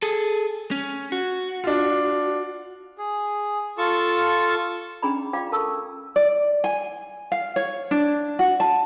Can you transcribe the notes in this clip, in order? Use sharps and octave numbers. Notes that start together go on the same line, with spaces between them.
G#4 A4
C#4
F#4
D4 F4
G#4
F4 A4 A5 C#6
C#4 D4 G#4 D5 A#5 B5
F4 D5 F5 G5 D6
A4 A#4 A5 C#6 E6
D5
G#5
F5
C#5
D4
F#4
A5